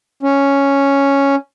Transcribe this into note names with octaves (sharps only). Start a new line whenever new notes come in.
C#4